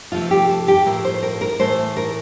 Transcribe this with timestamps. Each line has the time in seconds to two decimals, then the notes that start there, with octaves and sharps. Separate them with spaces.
0.12 F2 C3 F3 A3 F4
0.31 G4
0.49 A4
0.68 G4
0.86 A2 F3 A3 A#4
1.04 C5
1.22 A#4
1.41 A#4
1.60 A2 E3 A3 C5
1.97 A#4